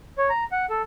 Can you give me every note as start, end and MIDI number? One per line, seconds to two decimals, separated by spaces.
0.18 0.29 73
0.30 0.44 82
0.52 0.66 78
0.70 0.82 69